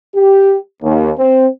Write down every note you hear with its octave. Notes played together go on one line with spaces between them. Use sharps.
G4
D#2
C4